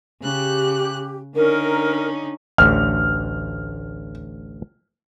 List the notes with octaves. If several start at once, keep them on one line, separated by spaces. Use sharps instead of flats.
C#3 G4 F#6
D3 C#4 D#4 A#4
A1 D2 D3 F6